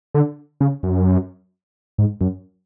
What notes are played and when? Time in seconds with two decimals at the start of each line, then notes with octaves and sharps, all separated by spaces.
0.14 D3
0.61 C#3
0.83 F#2
1.98 G#2
2.21 F#2